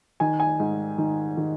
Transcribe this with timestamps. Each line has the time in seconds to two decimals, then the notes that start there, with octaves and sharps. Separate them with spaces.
0.20 D#3 G#5
0.40 G#5
0.60 G#2
0.98 D#3
1.37 D#3